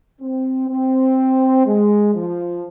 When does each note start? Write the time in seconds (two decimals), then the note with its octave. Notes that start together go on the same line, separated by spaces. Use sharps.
0.21 C4
0.69 C4
1.67 G#3
2.15 F3